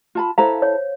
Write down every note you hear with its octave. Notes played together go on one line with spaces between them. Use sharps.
F4 A5 B5
E4 A4 C5 F5 A#5
C#5